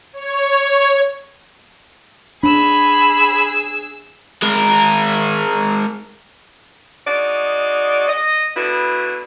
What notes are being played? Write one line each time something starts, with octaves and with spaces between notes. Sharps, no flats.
C#5
C#5
D4 G#4 B5 E6
G#3 A#4
G#3 D#4 F#4 D5
D#5
B2 D3 B3 E4 F#4